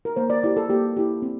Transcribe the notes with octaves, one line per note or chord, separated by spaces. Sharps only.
A#4
A#3 C5
D5
E4 G4 D5
A4
A#3 G4
E4 G4
C4